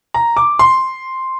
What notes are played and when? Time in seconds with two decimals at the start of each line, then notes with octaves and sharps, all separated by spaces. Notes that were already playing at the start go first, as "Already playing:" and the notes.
0.14 A#5
0.37 D6
0.59 C6